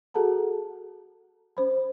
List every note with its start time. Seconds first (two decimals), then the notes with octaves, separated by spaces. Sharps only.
0.14 F#4 G#4 A4 F#5 A5 A#5
1.57 C#4 C5 B5